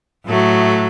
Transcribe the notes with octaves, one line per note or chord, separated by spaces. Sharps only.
A2 F#3 A3